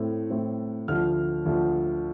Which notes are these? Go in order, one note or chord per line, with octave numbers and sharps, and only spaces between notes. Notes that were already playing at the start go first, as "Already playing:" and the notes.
Already playing: A2 A3 C4
A2 A3 C4
D2 D3 F3 F6
D2 D3 F3